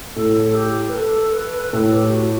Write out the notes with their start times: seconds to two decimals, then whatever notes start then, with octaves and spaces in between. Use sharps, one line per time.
0.16 A2 A4
0.36 A4
0.55 G4
0.89 B4
0.94 A4
1.33 B4
1.73 A2 A4
1.93 G4
2.13 F#4